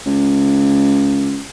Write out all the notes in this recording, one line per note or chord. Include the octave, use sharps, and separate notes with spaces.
C#2